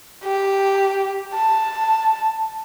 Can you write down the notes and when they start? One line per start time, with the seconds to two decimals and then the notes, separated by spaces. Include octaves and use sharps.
0.24 G4
1.34 A5